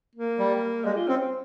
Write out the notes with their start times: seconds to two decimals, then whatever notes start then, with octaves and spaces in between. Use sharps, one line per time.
0.15 A#3
0.39 G3
0.84 G3 G#3
0.96 F4
1.08 C4 C#4